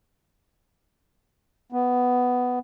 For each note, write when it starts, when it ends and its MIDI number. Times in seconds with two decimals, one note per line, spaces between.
1.72 2.59 59